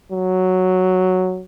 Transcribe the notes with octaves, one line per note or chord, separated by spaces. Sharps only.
F#3